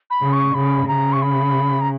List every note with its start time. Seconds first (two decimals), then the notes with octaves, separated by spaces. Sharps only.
0.10 B5
0.22 C#3
0.32 C#6
0.54 C#3 B5
0.87 C#3 A#5
1.12 C#6
1.22 B5
1.81 A#5